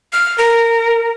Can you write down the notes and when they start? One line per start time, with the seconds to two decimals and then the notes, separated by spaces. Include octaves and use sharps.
0.13 F6
0.38 A#4